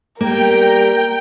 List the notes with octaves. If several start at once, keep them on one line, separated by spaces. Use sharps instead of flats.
G3 A#3 A#4 G5 A#5